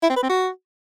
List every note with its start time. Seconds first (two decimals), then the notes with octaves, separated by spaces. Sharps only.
0.03 E4
0.09 C4
0.16 B4
0.23 C4
0.29 F#4